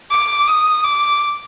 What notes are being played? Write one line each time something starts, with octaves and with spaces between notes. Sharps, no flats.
D6
D#6
D6